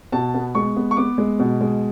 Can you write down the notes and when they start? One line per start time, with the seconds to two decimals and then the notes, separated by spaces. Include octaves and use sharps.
0.12 B2 A5
0.34 B3
0.55 G#3 C#6
0.76 B3
0.91 C#6
0.97 B3 D6
1.18 G#3
1.39 B2
1.61 G#3